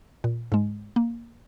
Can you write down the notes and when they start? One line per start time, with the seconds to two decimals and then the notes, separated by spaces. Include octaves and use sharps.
0.24 A#2
0.52 G#2 G#3
0.96 A#3